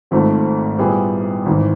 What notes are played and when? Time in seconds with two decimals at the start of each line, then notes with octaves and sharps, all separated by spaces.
0.11 G#1 G#2 F3 A3 C4
0.79 A#2 G3 B3 E4 G#4
1.46 G#1 G#2 E3